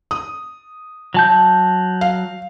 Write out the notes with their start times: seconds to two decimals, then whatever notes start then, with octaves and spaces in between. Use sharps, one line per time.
0.11 D#6
1.14 F#3 A5 G6
2.01 F5